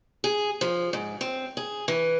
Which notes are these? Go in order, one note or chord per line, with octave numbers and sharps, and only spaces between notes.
G#4
F3
G#2
C4
G#4
E3